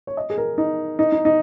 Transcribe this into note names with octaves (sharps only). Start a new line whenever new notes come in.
C#5
D#5
G#4
A#4
D#4
D#4
D#4
D#4